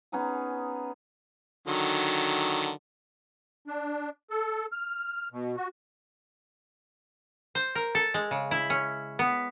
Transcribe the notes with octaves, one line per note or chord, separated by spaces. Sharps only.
B3 C#4 D#4 G#4
D3 D#3 F#3
D4
A4
F6
B2
F#4
C5
A#4
A4
G#3
C#3
E4
C#4
B3